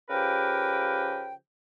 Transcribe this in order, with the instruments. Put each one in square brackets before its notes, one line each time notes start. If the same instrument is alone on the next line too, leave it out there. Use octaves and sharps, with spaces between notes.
[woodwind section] C#3 F3 G4 A#4 B4 G5